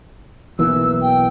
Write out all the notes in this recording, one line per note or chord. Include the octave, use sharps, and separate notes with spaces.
B1 E3 A#3 E6
G5